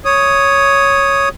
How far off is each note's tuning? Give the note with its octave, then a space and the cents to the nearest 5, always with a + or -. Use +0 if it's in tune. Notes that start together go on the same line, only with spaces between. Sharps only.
C#5 +0 D#6 +0